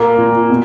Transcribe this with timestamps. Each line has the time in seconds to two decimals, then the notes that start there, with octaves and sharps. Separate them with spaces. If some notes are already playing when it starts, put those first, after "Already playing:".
Already playing: A#2 A#3 A#5
0.18 A#2
0.50 B2